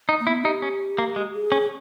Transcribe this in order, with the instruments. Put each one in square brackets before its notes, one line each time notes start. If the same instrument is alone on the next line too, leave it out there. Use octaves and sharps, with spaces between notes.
[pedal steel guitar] D#4
[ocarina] A#3
[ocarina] B3 [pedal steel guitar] E4
[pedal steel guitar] D#4 [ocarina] G4
[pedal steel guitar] C#4
A#3
G#3
[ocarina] G#4
[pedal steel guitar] C#4